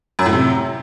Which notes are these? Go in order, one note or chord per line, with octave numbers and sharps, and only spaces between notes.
F#2
A2
C3